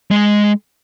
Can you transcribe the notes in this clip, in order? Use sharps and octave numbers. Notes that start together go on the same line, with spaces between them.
G#3